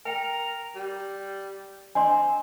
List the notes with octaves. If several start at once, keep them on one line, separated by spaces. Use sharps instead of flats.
A#4 G5 G#5
G3
C4 D4 D#5 G#5 C6